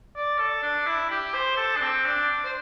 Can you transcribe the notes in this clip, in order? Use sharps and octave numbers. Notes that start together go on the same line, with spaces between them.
D5
A4
D4
E4
G4
C5
A4
D4
C4
D4
C5